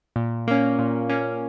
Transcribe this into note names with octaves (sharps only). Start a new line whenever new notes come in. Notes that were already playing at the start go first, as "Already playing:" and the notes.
A#2
A#3 C#4
A#2
A#3 C#4